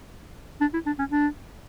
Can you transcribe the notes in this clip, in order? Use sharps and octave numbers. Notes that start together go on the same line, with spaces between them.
D4
E4
D4
C#4
D4